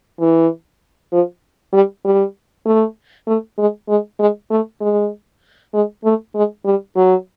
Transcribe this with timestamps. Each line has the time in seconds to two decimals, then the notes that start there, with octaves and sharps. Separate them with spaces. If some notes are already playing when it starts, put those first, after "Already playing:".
0.20 E3
1.12 F3
1.73 G3
2.05 G3
2.66 A3
3.27 A3
3.58 G#3
3.89 G#3
4.19 G#3
4.51 A3
4.81 G#3
5.74 G#3
6.04 A3
6.35 G#3
6.65 G3
6.96 F#3